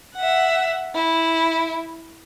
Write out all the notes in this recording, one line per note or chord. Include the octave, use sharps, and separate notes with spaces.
E5 F#5
E4